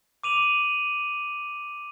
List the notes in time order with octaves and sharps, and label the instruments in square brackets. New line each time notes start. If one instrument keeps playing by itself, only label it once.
[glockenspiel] D6 D#7 F7 F#7